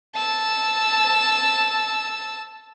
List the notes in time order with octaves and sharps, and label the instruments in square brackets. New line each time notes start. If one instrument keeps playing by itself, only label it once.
[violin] A5 E6